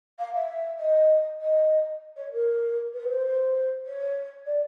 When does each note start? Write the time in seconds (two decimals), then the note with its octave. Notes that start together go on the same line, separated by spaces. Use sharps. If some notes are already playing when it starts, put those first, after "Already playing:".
0.19 F5
0.34 E5
0.79 D#5
1.41 D#5
2.16 C#5
2.33 A#4
2.94 B4
3.09 C5
3.85 C#5
4.46 D5